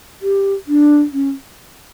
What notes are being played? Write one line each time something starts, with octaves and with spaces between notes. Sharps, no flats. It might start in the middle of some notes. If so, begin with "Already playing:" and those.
G4
D4
C#4